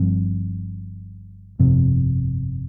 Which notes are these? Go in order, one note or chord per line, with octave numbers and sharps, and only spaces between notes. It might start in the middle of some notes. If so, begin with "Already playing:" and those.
Already playing: G1 G2 F3 C4
G1 F2 C3